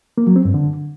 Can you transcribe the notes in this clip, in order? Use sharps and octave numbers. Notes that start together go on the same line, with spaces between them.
A#3
F#3
C4
G2
D3